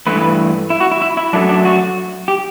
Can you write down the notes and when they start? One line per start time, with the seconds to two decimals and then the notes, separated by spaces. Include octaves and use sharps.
0.07 G2 E3 A3 B4
0.70 E4
0.80 F#4
0.91 E4
1.02 E4
1.17 E4
1.33 F#2 F#3 A3 D4
1.49 D4
1.65 F#4
2.28 G4